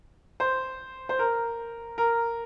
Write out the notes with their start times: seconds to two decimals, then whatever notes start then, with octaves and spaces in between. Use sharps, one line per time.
0.40 C5
1.09 C5
1.19 A#4
1.98 A#4